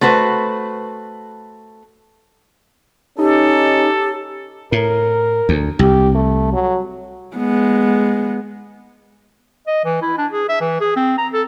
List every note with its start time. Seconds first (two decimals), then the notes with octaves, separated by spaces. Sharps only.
0.01 A3 F#4 B4 C5
3.18 C#4 D#4 G4 A4
4.72 A2 A#4
5.49 D2
5.79 C2 G4
6.14 A3
6.53 F#3
7.36 G#3 B3
9.67 D#5
9.85 E3
10.02 E4
10.18 D4
10.32 G#4
10.49 E5
10.61 E3
10.81 G#4
10.96 C4
11.18 A#5
11.33 A4